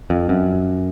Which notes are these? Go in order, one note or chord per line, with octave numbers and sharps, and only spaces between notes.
F2
F#2